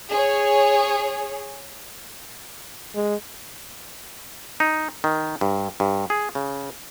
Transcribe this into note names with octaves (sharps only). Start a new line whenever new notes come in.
G#4 C#5
G#3
D#4
D#3
G2
G2
G#4
C#3